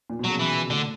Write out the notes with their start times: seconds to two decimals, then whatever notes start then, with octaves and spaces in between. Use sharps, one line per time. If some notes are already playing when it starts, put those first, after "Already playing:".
0.10 A#2
0.19 B2
0.24 F#3
0.30 C#3
0.39 E3
0.70 A2 D3